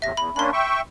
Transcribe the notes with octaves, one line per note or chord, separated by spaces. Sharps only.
E2 A2 C3 E5 A#6
E2 B5
A#3 C#4 D4 B5 C6
E5 G5 C#6